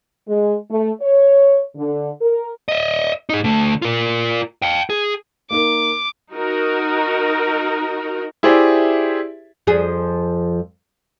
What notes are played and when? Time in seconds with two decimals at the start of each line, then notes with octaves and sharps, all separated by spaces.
0.28 G#3
0.70 A3
1.01 C#5
1.76 D3
2.22 A#4
2.68 D#5 E5
3.29 D#4 G#4
3.44 D3 A3
3.82 F4 A#4
4.62 F5 G5
4.90 G#4
5.51 A#3 D#4 A#4 D6
6.34 D#4 F#4 A#4
8.43 E4 G4 G#4 C5 D5 E5
9.67 F2 F3 G#4